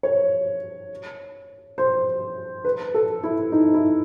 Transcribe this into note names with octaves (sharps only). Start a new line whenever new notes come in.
C#5
C5
B4
A4
E4
D#4
E4